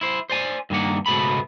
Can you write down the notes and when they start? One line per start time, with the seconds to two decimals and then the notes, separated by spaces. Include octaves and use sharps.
0.01 E4 C5
0.30 C5 D5 G#5
0.70 G2 D#3 A#3 F#5
1.06 C#2 G#2 B2 A3 B3 B5